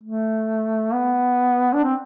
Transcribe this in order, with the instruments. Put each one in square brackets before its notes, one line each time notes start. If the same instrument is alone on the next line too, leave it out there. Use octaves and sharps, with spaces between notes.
[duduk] A3
B3
D4
C4